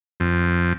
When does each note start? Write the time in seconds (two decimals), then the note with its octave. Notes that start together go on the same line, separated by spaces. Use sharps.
0.20 F2